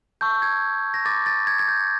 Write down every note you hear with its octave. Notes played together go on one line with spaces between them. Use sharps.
A5 C#6 E6 G6
G#6
A#6
B5 D6 G6 A6
A6
G#6
G#6
G6